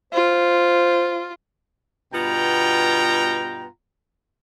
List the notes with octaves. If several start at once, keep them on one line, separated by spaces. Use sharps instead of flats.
F4 C5
G2 B2 B3 F4 G5 A#5